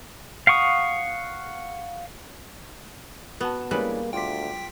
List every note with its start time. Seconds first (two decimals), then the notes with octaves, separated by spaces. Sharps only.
0.47 F5 F#5 C#6 D#6
3.41 B3 F#4 F#5 A5
3.71 E3 G3 G#3 A#3 C#4 D4 B4
4.13 D2 F4 G5 C6 D6 B6